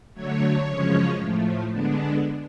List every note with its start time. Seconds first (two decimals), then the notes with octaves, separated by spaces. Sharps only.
0.14 D3 F#3 A3 C#5
0.66 F#2 C#3 F3 G#3 C#4
1.18 A2 F3 A3
1.71 D3 G#3 B3 D4